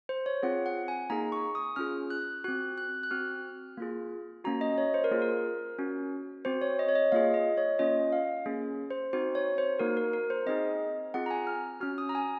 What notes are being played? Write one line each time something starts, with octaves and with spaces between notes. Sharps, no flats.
C5
C#5
C4 F4 G#4 F#5
F#5
G#5
A#3 D#4 G#4 A#5
C#6
D#6
C#4 F4 G#4 F6
F#6
C4 F#4 F#6
F#6
F#6
C4 F#4 F6
A#3 F4 G#4
A#3 C#4 F#4 A#5
D#5
C#5
C5
A#4
A#3 F4 G#4
A#4
C#4 F#4
C4 F#4 C5
C#5
D#5
C#5
D#5
A#3 F4 G#4 F5
D#5
C#5
A#3 C#4 F4 D#5
F5
A#3 C#4 G#4
C5
C4 D#4 F#4 C5
C#5
C5
A#3 D#4 F#4 A#4
A#4
A#4
C5
C4 D#4 G#4 D#5
C4 F4 G#4 F#5
A#5
G#5
F6
C#4 F#4 F6
D#6
A#5
G#5